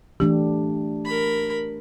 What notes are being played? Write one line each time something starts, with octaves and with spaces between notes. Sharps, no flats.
E3 A3 D4 G4
A#4 B5